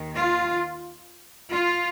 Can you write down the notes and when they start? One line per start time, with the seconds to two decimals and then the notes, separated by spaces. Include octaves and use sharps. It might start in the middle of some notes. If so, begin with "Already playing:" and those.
Already playing: D#2 D#3
0.16 F4
1.50 F4